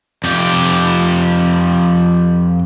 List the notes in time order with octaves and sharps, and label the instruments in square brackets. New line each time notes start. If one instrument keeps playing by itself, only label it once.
[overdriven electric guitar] F2 G4